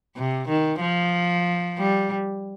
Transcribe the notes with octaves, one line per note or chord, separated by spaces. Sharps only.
C3
D#3
F3
G3